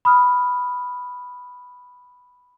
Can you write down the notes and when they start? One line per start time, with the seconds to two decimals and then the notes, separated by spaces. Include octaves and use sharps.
0.05 B5 D#6 F6